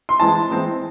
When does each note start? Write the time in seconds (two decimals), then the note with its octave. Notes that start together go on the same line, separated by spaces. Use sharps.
0.09 C6
0.20 E3 G#3 C4 A5
0.49 E3 G#3 C4